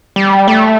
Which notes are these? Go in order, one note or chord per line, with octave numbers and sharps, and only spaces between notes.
G3
A3